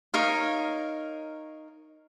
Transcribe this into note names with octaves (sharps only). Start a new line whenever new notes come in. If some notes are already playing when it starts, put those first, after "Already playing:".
D#4 A#4 C#5 F5